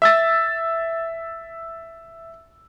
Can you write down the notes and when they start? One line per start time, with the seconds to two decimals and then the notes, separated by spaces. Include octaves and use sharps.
0.02 E5 E6 A6